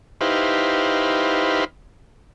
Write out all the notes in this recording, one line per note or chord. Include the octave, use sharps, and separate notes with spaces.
D#4 E4 G4 B4 C5 F5